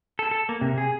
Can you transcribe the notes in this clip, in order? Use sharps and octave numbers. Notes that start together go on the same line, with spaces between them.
A4
A4
A#3
C3
G#4